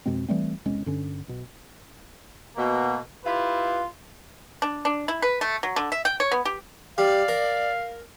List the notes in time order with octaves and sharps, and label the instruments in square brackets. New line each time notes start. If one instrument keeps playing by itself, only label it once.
[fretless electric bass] F2 B2 G#3 C4
E3 G3 A3 C4
E1 C2 G#3 C#4
G2 D3 C#4
B1 B2
[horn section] B2 A#3
E4 F4 G4 B4
[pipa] D4
D4
E4
B4
A3
F#3
D3
E5
G5
C#5
B3
G4
[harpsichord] G3 [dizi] D5 [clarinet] F5
[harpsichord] A#4